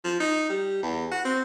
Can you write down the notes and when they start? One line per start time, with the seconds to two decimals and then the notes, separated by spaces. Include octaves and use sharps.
0.05 F3
0.20 D#4
0.50 G3
0.83 E2
1.12 F#4
1.25 C4